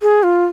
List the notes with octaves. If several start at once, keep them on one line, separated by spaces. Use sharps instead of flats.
G#4
F4